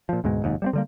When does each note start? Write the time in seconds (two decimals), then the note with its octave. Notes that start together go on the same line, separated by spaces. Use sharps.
0.09 A#2 F3
0.24 D2 G#2 B2 G#3
0.42 F1 D#2 G#2
0.62 G3 A3 C4
0.73 D3 G3 A#3